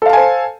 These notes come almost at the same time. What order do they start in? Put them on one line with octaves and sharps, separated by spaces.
A4 F5 A5 G#5 C5